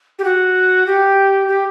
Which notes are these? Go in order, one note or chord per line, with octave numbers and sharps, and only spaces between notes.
G4
F#4
G4
G4